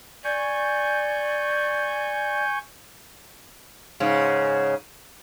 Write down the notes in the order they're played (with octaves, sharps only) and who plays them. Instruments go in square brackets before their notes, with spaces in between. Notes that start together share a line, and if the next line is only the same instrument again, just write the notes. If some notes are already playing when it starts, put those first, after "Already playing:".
[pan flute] D5 [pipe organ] G#5 C#6 G6
[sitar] G#2 C#3